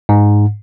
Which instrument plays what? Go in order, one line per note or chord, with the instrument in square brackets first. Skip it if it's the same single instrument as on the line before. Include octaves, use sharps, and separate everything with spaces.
[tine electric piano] G#2